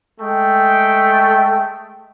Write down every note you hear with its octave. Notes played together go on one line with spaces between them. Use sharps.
G#3 A3 G5